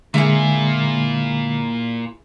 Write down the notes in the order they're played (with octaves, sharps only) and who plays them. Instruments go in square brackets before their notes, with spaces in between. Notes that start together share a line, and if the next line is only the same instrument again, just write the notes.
[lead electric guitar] A#2 A#3 [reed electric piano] D3 G#3 [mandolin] E4 G#4